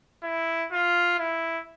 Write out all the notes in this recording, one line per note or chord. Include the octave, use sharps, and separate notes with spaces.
E4
F4
E4